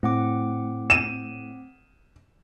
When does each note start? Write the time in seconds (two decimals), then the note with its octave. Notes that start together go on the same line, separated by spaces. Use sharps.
0.03 A2 C4 F#5 D6
0.90 D#7 E7